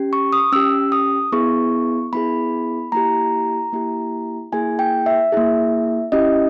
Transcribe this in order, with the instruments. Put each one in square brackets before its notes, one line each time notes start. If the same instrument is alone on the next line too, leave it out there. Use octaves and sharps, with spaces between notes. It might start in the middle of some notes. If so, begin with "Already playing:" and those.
Already playing: [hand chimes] C#4 G4
C#6
D#6
C#4 G4 E6
D#6
B3 E4 G#4 C#6
B3 E4 G#4 B5
A#3 E4 G4 A#5
A#3 E4 G4
A#3 E4 G#4 G#5
G5
E5
A#3 E4 G#4
C#4 E4 G4 D#5